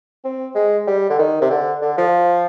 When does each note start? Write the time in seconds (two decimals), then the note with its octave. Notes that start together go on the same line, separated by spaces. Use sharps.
0.25 C4
0.55 G#3
0.87 G3
1.10 D3
1.19 D#3
1.41 C3
1.50 D3
1.82 D3
1.98 F3